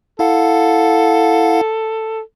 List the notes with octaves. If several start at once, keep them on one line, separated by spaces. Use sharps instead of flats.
E4 A4 F5 F#5